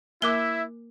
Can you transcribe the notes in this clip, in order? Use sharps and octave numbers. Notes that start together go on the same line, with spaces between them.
A#3 E4 A#4 E5 D6 F#6 G7